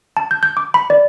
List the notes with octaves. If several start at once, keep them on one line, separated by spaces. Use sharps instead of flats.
A5
G6
G6
D6
B5
D5